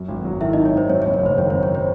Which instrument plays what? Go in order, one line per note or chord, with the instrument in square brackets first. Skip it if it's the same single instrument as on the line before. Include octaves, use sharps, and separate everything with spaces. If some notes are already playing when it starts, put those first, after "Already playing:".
Already playing: [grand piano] F#2
G#1
F#3
[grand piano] D#3 [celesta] E4 E5
[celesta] D#4 D#5
[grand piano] F#2
[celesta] C#5
[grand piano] G#1 [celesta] C5
[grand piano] F#2 [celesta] C#5
[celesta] C#5
[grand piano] F#1
[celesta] C#5
[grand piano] F#1 [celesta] C5
[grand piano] D#3 [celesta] C#5
[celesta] C5
[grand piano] F#2
[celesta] C#5
C5